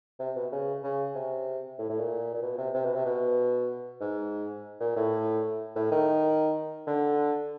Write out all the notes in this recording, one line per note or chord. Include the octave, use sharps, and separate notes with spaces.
C3
B2
C#3
C#3
C3
A2
A2
A#2
A#2
B2
C3
C3
B2
C3
B2
G#2
A#2
A2
A2
D#3
D3